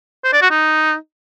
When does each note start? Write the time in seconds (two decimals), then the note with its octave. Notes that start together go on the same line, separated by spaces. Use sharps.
0.24 C5
0.33 D5
0.41 F#4
0.50 D#4